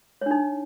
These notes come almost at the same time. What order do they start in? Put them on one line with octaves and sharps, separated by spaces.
C#5 D4 D#4